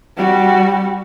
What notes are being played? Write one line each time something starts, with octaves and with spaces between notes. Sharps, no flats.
G3 F#4